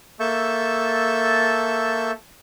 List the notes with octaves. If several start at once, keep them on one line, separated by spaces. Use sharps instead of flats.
A#3 A4 E5 A5 C#6 G6